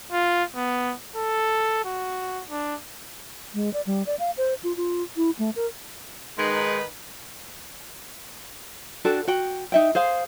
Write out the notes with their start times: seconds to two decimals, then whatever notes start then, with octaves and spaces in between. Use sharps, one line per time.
0.12 F4
0.56 B3
1.16 A4
1.85 F#4
2.50 D4
3.54 G#3
3.74 D5
3.86 G3
4.06 D5
4.19 F5
4.37 C5
4.64 F4
4.77 F4
5.17 E4
5.39 A3
5.56 A#4
6.38 D#3 G#3 D#4 B4
9.05 D4 F#4 A4 G5
9.27 F#4 G5
9.72 D#4 E5 G5
9.95 G#4 C5 F5